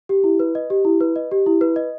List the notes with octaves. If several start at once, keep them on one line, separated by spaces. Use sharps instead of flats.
G4
E4
B4
D#5
G4
E4
B4
D#5
G4
E4
B4
D#5